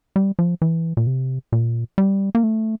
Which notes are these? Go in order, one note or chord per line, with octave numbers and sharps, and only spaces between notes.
G3
F3
E3
A#2
C3
A#2
G3
A#3
A3